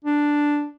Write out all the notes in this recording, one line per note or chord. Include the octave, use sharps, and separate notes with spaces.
D4